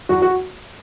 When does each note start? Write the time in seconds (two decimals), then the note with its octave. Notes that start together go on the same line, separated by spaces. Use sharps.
0.09 E2 F#4
0.22 F#4